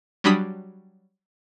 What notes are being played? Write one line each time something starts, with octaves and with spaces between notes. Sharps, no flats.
F#3 G3 D4 B5 D#6 B6